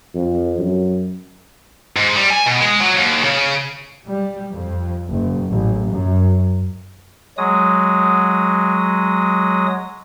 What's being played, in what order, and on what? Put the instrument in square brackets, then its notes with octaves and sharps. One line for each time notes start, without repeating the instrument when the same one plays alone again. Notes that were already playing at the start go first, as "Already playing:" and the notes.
[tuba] F2
F#2
[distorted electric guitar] G#2
G3
G#5
B2
G#3
F#3
D#2
C#3
[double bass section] G3
F2
F#1
A1
F#2
[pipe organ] F#3 G#3 D#6